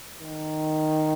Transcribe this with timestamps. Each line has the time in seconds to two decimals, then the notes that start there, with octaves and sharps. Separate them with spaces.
0.21 D#3